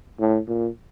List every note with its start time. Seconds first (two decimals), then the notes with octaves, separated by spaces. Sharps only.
0.20 A2
0.48 A#2